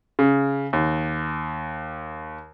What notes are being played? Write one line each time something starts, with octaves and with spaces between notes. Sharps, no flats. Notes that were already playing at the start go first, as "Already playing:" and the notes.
C#3
D#2